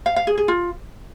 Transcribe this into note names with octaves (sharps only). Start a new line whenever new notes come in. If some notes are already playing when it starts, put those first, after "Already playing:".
F5
F5
G#4
G#4
F4